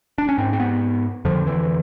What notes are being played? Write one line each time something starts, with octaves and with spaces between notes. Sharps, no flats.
D4
C#4
G#2 C4
C4
B3
F2 D3 F3
E3